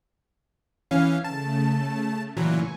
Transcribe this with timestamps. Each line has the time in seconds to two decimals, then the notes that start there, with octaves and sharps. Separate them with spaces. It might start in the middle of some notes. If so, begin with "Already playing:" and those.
0.91 E3 C#4 F5
1.24 C#3 A3 A5
2.37 A#2 E3 F#3 G#5 C#6